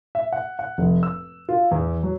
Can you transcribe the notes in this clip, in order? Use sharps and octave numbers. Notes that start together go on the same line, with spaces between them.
E5
F#5
F#5
F1
E6
F4
E2
F#3